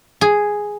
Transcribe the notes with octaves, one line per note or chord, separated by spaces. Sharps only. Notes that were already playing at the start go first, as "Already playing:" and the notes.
G#4